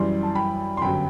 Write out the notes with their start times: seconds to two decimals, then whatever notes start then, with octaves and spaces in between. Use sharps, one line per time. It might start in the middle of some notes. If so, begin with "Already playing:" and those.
Already playing: F#2 E3 G3 C6
0.23 A5
0.35 G5 B5
0.77 C6
0.82 G1 F#2 F#3 G5 B5